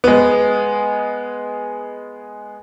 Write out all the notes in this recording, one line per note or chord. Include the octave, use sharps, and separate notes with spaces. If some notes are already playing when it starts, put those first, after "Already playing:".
G#3 B3